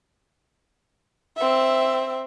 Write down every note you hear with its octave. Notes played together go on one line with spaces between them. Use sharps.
C4 E5